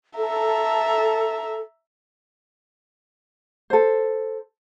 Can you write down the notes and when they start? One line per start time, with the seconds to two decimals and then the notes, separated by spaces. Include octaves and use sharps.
0.17 A4 E5 A#5
3.70 A4 C5